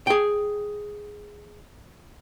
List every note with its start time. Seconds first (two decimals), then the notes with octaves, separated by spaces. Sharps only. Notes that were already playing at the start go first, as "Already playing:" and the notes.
0.07 G#4 G5